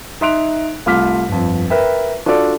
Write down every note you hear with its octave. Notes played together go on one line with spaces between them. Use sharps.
D#4 E5 C6 F#6 D7 F7
C2 A3 F4 D6 F6 B6
G1 F2
A#4 B4 E5 G5
D4 F4 F#4 A4 D5